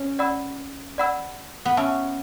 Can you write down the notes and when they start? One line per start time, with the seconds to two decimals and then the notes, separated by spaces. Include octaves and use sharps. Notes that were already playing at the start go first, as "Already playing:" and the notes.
Already playing: C#4
0.19 D5 F#5 B5 E6
0.98 D5 F#5 B5 E6
1.65 B3
1.77 C#4 E5 A5 C#6 E6